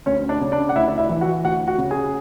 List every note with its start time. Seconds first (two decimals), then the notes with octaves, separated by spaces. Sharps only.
0.06 D2 C#4 C#5
0.29 D4 D5
0.41 C#3
0.52 D4 D5
0.69 F#5
0.75 D2 E4 E5
0.88 D5
0.98 E4 E5
1.09 E3
1.21 F#4 F#5
1.44 D2 F#4 F#5
1.68 F#4 F#5
1.78 C#3
1.91 G#4 G#5